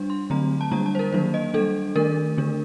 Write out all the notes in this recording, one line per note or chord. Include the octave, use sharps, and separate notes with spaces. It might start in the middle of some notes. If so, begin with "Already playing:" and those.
Already playing: G3 D4
C6
D3 F#3 A3 C4 A#5
A5
D3 G3 A#3 D4 A#5
A5
C5
A#4
D#3 F#3 A#3 D4 C5
D#5
G3 D4 A4
D#3 A3 D4 A#4
D3 A3 D4